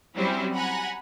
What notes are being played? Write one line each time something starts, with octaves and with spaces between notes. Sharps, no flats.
F#3 G3 C4 C#4 E4
F#5 G#5 A#5 B5